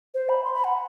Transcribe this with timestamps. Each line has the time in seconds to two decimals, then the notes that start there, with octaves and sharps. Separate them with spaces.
0.14 C5
0.29 B5
0.44 C6
0.54 B5
0.64 F#5